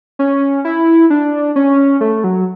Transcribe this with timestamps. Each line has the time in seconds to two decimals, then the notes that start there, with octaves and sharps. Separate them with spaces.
0.19 C#4
0.65 E4
1.10 D4
1.56 C#4
2.01 A3
2.24 F#3